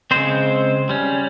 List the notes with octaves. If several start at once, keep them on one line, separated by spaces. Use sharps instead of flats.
C#3 G#3 C4 C5
G3 C#4